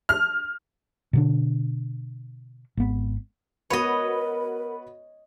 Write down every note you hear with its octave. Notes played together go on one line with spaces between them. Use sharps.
F6
B2 D3 D4
G#1 B3
B3 F#4 A#4 B4 C#5 D#5